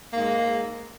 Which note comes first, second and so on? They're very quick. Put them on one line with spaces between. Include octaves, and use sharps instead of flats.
A#3 G#2 G#3